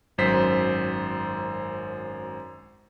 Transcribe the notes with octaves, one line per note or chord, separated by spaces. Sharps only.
G#1 F#2 C5 B6